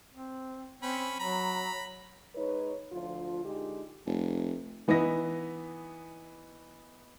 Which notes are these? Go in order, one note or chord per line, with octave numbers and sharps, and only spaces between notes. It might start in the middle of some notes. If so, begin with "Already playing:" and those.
C4
C4 C#4 B5
F#3 A#5 B5
G#3 D#4 B4 C#5
D2 F3 F4
D3 G#3 D#4 G4
F1
E3 B3 D#4 E4 A#6